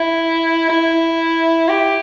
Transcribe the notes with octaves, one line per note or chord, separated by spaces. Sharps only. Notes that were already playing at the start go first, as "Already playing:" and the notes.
Already playing: E4
E4
G4